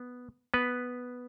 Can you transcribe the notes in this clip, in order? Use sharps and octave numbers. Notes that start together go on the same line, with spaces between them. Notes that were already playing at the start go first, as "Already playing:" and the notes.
Already playing: B3
B3 B4